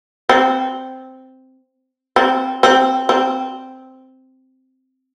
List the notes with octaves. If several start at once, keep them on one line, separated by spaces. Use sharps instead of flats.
C4
C4
C4
C4